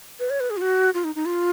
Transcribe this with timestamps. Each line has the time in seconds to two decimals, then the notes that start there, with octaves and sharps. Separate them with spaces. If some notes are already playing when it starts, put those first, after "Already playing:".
0.20 B4
0.30 C#5
0.40 B4
0.50 G#4
0.57 F4
0.61 F#4
0.94 F4
1.04 D#4
1.15 D#4
1.26 F4